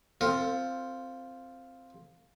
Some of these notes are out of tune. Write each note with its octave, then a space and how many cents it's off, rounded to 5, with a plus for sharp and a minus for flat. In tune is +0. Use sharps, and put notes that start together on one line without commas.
C4 +0 F4 +0 A4 +40